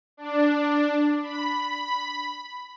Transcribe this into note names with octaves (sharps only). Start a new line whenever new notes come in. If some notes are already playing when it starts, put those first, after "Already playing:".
D4
B5